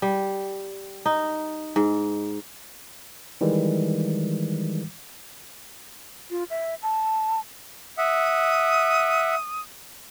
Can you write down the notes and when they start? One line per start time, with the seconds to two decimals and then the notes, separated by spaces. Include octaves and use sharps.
0.02 G3
1.06 D#4
1.76 G#2
3.41 D#3 E3 G3 G#3
6.31 F4
6.50 E5
6.82 A5
7.98 E5 F#5 D#6